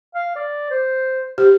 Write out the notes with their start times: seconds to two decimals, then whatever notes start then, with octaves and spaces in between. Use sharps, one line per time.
0.15 F5
0.36 D5
0.70 C5
1.38 G4 C5